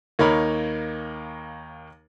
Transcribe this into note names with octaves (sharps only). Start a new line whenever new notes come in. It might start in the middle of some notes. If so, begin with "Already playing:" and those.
D#2 A#3 D#4 A#4 C#5 B5